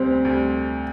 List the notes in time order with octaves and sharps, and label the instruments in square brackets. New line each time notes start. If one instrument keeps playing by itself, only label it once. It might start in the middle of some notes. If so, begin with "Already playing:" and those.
Already playing: [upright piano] D2 C3 G3 [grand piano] C4
[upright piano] D2 C3 G3